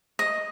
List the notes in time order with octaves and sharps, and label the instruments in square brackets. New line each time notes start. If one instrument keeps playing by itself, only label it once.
[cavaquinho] D#5